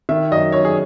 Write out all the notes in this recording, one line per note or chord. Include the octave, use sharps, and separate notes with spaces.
D#3 E5
F#2 D#5
F#2 C#5
G#4